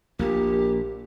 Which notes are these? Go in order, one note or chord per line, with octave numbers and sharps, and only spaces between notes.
A#1 A#2 A#3 G4